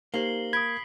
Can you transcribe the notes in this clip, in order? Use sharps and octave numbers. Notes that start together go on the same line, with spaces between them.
A#3 D#4 G4 C5 C7 F#7 G7
B5 D#6 G#6 B6 D7